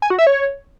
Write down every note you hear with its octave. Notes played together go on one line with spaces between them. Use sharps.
G#5
F#4
E5
C#5